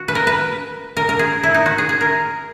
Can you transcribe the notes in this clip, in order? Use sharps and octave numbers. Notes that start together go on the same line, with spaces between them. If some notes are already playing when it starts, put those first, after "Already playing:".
Already playing: F#4
B4
A#4
B4
A#4
A#4
G#4
E4
D#4
F#4
G#4
G#4
A#4